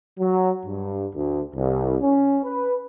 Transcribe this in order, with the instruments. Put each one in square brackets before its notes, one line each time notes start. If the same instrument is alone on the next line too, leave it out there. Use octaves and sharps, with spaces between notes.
[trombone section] F#3
G2
D2
C2
C#4
B4